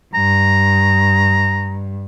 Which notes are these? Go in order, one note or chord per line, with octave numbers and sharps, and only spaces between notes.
G2 A#5